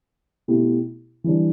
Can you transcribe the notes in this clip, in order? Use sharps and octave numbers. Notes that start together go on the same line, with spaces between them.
B2 A3 E4 G4
E3 G3 D4